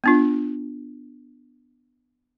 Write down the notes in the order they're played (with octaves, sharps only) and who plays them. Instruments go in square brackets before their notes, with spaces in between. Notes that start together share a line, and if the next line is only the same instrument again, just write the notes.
[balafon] B3 D4 F4